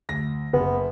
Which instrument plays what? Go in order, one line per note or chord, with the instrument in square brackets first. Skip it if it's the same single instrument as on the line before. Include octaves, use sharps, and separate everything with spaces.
[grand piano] D2 A#6
[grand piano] F#1 [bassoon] B3